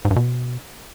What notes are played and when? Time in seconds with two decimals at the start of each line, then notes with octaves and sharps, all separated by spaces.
0.05 G#2
0.11 G2
0.16 B2